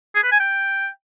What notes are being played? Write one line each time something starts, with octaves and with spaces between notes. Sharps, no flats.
G#4
B4
G#5
G5